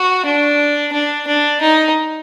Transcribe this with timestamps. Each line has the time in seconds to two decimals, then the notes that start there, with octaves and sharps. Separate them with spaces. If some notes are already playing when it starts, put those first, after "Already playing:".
Already playing: F#4
0.26 D4
0.93 D4
1.27 D4
1.61 D#4